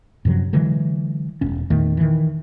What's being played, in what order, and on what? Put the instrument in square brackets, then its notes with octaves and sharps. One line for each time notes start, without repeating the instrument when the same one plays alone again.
[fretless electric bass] F#2 C3 F3 F#3
D3 E3 F#3 G#3
E1 C#4
E2 A#2 D#3 A3
D#3 E3